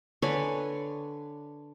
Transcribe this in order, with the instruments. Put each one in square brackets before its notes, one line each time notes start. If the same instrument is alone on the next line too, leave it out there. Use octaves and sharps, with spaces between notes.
[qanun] D3 B4 C#5 G#5